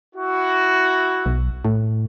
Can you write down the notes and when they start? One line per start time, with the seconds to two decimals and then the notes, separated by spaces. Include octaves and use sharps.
0.15 E4 F#4
1.26 B1
1.65 A2